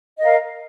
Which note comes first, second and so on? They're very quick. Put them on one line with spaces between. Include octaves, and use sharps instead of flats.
D#5 A#4 F5